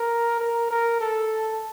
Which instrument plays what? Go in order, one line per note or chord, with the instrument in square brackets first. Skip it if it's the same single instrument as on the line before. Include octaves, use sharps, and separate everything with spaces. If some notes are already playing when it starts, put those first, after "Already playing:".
Already playing: [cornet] A#4
A#4
A#4
A4